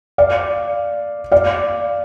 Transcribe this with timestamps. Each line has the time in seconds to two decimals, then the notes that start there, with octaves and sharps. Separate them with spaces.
0.18 D5 F5
1.32 D5 F5